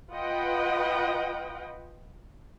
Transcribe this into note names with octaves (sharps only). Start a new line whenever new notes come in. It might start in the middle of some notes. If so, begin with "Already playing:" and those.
F4 B4 D#5 F#5 G5